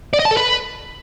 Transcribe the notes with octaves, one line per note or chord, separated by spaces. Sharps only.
D5
D#5
A5
A4
B4